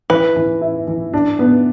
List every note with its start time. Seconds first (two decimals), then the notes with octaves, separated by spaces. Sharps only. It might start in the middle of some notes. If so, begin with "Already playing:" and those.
0.10 E3 B4
0.36 E3
0.61 E4
0.87 E3
1.13 D4
1.39 B3